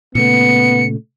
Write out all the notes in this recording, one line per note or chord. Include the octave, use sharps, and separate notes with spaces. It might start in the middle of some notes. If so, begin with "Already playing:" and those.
A#2 C#3 A3 B3 C#7